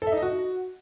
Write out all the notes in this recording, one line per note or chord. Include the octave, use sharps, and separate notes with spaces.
A4
E5
D#4
D#5
F#4